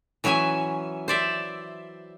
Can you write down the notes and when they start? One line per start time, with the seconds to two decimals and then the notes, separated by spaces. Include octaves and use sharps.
0.24 E3 F#3 C#4 E5 G#5
1.08 C5 D5 E5